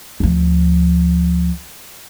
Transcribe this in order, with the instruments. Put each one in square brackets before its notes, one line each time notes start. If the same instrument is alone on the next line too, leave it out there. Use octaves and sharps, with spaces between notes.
[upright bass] D2 F3